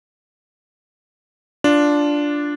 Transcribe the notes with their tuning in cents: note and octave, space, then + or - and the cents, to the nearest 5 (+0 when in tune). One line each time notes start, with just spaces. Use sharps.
D4 -5 F4 +0